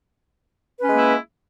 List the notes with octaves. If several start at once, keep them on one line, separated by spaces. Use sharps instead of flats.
G#3 A#3 C#4 E4 B4